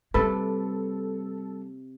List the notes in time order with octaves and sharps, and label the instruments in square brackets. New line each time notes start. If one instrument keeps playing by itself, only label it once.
[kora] C3 [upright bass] G3 A#3 [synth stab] A4 [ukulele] B4